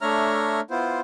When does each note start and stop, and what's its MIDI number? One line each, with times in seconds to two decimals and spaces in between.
0.01 0.60 57
0.01 0.60 62
0.01 0.60 73
0.01 0.60 76
0.01 0.60 82
0.01 0.60 89
0.71 1.01 59
0.71 1.01 64
0.71 1.01 65
0.71 1.01 72